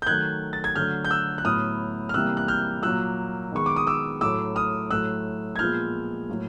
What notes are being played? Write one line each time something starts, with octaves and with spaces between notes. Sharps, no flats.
G6
D#3 F#3 A3 F#6 G#6
A6
G#6
D3 F#3 A3 F6 G6
G6
E6 F#6
F#6
A2 F#3 B3 D#6 F6
F6
C3 E3 G3 A#3 E6 F#6
F#6
F6 G6
A#2 F#3 A#3 E6 F#6
D#3 G#3 B3 C#6
D6
D#6
D6 E6
A2 F#3 A3 D6 E6
D#6 F6
A2 F#3 A3 E6 F#6
G#6
A#2 F3 G#3 B3 F6 G6
A2 F#3 A#3